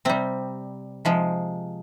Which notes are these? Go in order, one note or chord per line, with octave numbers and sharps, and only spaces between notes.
C3 G3 C4
C3 F3 G#3